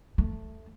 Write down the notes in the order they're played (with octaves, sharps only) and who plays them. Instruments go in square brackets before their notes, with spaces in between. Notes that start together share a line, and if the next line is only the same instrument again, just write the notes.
[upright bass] A3